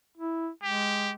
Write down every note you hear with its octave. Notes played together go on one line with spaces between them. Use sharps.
E4
G#3 G4